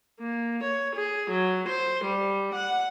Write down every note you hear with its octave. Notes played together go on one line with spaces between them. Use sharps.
A#3
C#5
G#4
F#3
C5
G3
F#5